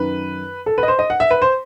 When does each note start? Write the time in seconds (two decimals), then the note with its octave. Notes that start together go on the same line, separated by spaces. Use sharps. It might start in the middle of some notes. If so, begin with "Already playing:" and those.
Already playing: F#2 D#3 B4
0.66 A4
0.78 B4
0.83 D#5
0.88 C5
0.99 D#5
1.10 F#5
1.20 E5
1.31 B4
1.42 C5